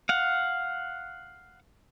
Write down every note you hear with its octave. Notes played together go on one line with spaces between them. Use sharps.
F5 F#5